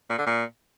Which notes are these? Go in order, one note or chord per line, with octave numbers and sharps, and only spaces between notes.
A#2
D3
A#2